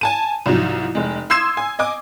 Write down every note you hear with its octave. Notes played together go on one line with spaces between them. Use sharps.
G#5 A5 D#7
C2 G#2 F3 F#3
F1 G#3
C6 D#6 E6 G#6 C7 E7
G#5
D#5 G#5 D6